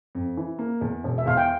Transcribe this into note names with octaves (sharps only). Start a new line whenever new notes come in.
F2
E3
A#3
E2
E1
E5
E2 F5
G5